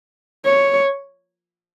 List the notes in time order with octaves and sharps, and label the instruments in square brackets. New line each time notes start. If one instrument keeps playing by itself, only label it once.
[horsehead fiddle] C#5